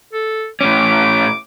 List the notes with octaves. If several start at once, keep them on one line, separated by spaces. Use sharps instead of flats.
A4
A2 C#4 D6